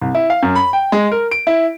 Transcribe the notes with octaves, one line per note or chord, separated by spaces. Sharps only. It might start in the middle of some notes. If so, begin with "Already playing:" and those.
C2
E4
F5
F#2
B5
G5
G#3
A#4
D7
E4